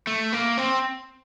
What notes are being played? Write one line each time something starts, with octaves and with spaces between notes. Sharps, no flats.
A3
A#3
C4